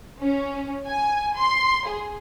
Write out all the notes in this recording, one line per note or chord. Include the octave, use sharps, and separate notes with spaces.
C#4
G#5
C6
G#4